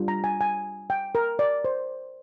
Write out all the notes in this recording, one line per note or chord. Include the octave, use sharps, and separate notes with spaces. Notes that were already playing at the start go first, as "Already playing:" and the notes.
Already playing: G3 D4 F4
A#5
G#5
G#5
G5
A#4
D5
C5